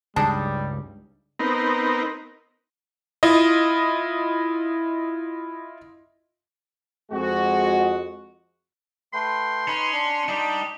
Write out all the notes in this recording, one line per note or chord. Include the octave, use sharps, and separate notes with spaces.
C#2 G2 G3 D4 D#4 G#4 A5
B3 C4 D#4 A#4
E4 F4 D#5
F2 G#3 F#4
A3 B4 G5 C6
C#4 D#4 B4
D4
G3 D4 D#4 G4 D#5